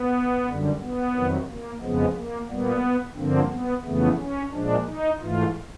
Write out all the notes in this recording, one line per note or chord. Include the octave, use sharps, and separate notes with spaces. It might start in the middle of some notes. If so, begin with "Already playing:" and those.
Already playing: B3
F#2 D3 G3
B3
F2 C3 D#3 F#3
A#3
F2 C#3 F3 G#3 B3
A#3
A#2 G3 A#3 B3
G2 D3 F3 A#3 C4
B3
F2 C#3 E3 A3 B3
C#4
A#2 F3 G#3 D4
D#4
G#2 E3 A3 F4